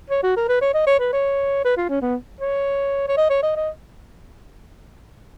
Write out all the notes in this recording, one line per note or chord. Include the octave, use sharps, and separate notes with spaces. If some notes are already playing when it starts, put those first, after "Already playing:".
C#5
F#4
A#4
B4
C#5
D#5
C#5
B4
C#5
B4
F4
C#4
B3
C#5
C#5
D#5
C#5
D#5
D#5